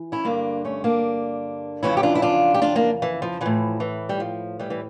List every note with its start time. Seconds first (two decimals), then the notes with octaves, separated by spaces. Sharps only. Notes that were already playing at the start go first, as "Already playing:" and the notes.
Already playing: E3
0.12 C#4 E4
0.24 G2 D3 A#3 D4
0.65 A3 C#4
0.84 A#3 D4
1.83 F2 C#3 E3 C#4 E4
1.97 G4
2.03 D4 F4
2.15 E4
2.22 D4 F4
2.54 G4
2.62 D4 F4
2.76 A#3 D4
3.02 E3
3.22 F3
3.41 A2 E3 F3
3.80 E3
4.09 G3
4.20 F3
4.59 E3 G3
4.70 E3